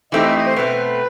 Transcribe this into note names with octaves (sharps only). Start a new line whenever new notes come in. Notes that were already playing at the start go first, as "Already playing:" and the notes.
E3 A3 C4 D#4 G4 D#5
E5
D#5
C5
B2 A3 C4 B4